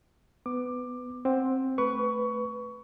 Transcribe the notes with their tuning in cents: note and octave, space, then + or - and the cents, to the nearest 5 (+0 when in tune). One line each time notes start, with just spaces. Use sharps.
B3 +15 D6 +15
C4 +10 F#5 +0
A3 +0 B4 +0 C#6 +20